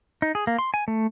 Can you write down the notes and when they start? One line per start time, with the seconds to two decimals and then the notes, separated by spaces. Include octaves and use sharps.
0.22 D#4
0.35 G#4
0.47 A#3
0.59 C6
0.74 G#5
0.88 A3